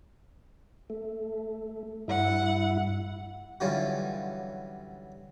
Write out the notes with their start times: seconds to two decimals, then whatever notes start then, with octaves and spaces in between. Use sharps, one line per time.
0.90 A3
2.08 G2 E4 F#5
3.60 D3 E3 F#3 G3 C#4 F4